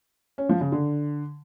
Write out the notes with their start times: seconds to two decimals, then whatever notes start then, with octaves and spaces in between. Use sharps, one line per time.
0.38 C#4
0.49 F3
0.61 C#3
0.72 D3